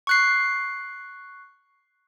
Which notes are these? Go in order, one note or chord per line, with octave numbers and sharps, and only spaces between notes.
C#6 F#6 C7